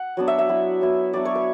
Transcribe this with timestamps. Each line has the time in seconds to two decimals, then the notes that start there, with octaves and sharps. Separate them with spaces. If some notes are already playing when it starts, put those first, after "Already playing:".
Already playing: F#5
0.17 F#3 B3 D4
0.28 E5
0.38 E5
0.49 F#3 B3 E4
0.81 F#3 B3 E4
1.13 F#3 B3 D4 D5
1.25 C#5
1.35 B4